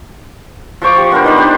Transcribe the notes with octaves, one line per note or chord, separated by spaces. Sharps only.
F3 C5 C#6 D6
G4
B3 D4 A#4 C5
D#4 C5 B5
D4 G4